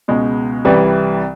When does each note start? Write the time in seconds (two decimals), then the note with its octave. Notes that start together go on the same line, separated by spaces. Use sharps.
0.08 C#2 B2 G#3
0.65 C2 C3 E3 G3